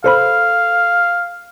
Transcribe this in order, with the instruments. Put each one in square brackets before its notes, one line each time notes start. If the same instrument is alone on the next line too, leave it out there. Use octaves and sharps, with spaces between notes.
[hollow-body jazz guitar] A4 C5 B5 [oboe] F5